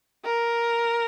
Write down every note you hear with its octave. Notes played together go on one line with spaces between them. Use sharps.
A#4